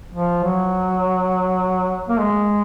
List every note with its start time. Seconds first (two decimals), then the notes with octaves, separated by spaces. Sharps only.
0.14 F3
0.44 F#3
2.09 A#3
2.19 G#3